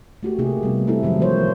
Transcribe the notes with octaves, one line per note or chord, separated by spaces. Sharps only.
A3 F#4 G4
C3 A#3 D#4 G#4
G3 B3
A3 C4 D#4 E4 A4
D#3 F3 F#3 G#3 A3
E3 A3 A#3 C5 C#5